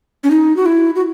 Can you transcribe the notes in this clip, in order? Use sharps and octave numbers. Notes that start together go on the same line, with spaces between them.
C#4
D#4
F#4
E4
F#4